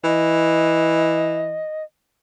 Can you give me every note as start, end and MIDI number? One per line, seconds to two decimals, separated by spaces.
0.04 1.63 52
0.04 1.83 75